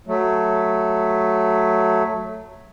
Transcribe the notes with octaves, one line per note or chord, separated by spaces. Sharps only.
F#3 A3